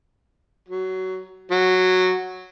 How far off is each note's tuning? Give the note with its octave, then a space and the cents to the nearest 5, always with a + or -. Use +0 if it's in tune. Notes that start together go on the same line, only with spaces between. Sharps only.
F#3 +15
F#3 -5